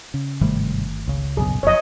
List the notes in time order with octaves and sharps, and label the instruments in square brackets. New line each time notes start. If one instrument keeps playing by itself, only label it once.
[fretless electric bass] C#3
[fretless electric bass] G1 D#3 A3 [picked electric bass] G#2 C3 G3
[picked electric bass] C#2 C#3
[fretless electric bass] A#1 F#2 B2 [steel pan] G#4
[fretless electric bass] F#1 F2 [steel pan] C#5 D#5